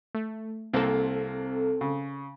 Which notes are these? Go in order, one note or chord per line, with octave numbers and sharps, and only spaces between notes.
A3
C2 A#3 C4 A4
C#3